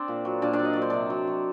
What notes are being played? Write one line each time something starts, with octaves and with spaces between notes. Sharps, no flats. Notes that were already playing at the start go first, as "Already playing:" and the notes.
Already playing: C4 D4 C5 D5
A#2
F#3
A#2 D4 D5
D4 D5
F#3
D#5
F#3 D5
C5
C3 D4 D5
F#3
F#3